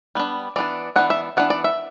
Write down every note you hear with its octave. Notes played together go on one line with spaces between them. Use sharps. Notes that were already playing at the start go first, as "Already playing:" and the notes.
G3 B3 D4
E3 B3 D4 D5
E3 B3 D4 F#5
E5
E3 B3 D4 F#5
D5
E5